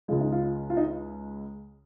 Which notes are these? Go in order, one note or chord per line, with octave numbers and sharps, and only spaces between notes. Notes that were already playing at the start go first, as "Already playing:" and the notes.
C#2 C#3 G#3 F4
D#4
F4
F4
D#4